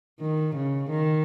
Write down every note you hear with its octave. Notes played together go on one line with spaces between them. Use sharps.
D#3
C#3
D#3